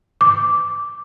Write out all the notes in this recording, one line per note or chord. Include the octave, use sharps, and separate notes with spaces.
D6